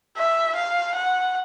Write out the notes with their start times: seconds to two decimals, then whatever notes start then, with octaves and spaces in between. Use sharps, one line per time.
0.17 E5
0.55 F5
0.95 F#5